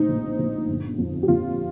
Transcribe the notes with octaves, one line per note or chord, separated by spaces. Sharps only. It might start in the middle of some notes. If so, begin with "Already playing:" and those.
Already playing: A2 C4 D#4
A#1
A#1
G1
F2
G4
F2 F4